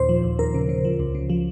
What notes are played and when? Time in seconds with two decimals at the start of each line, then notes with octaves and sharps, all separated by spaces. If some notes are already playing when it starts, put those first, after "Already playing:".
Already playing: D#2 A#2 C5
0.09 F3
0.24 D#2
0.39 D#2 A#4
0.54 C#3
0.69 C#3
0.85 F3
0.99 C#2
1.15 C#3
1.30 F3